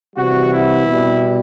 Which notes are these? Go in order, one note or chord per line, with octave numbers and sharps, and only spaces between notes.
C3 E3 G3 F#4
E4
B2 G3